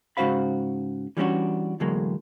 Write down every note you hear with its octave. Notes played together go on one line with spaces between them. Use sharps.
G#2 C#3 F#4 C5 F5 B5
E3 G3 B3 C#4 D4 F#4
E2 A2 D3 F#3 G#3 A#3